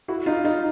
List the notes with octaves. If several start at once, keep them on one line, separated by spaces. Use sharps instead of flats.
E4 F#4
D#4 F4
D#4 F4